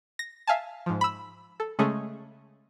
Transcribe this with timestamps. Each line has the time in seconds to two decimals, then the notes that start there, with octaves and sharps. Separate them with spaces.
0.19 A#6
0.47 E5 F5 G#5 A5
0.86 G#2 F3
1.01 B5 E6
1.60 A4
1.79 C#3 G#3 A3 C#4 G#4